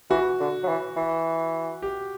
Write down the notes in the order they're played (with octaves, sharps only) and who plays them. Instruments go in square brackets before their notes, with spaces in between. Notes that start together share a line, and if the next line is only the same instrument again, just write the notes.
[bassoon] E3 [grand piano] F#4
[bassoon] D3
F#3
E3
E3
[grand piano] G4